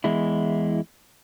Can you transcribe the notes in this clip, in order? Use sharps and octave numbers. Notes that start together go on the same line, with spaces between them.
E2 G#3 E4